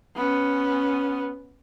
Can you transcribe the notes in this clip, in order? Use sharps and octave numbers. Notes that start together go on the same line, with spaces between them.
B3 C#4